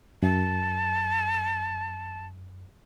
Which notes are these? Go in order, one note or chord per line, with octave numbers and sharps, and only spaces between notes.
F#2 A5